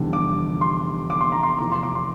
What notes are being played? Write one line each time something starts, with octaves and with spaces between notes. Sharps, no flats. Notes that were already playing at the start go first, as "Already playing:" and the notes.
Already playing: F1 E2 D3 G3
D6
C6
D6
C6
A#5
C6
F1 E2 E3 D6
C6
D6
C6